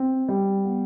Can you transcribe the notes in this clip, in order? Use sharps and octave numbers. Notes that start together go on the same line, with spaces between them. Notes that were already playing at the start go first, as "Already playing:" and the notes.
Already playing: C4
G3
B3